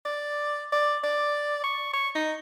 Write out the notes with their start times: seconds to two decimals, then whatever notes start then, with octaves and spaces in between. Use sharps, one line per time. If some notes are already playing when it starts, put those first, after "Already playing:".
0.05 D5
0.72 D5
1.04 D5
1.64 C#6
1.93 C#6
2.15 D#4